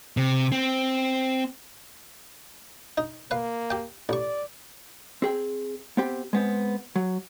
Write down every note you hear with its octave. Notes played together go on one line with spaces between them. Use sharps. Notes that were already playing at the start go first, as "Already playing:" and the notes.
C3
C4
D#4
A#3 B4 F5
G4 G5
A1 D5 C#6
C4 G#4 G5
B3 C4 G4
G#3 B3 C4
F#3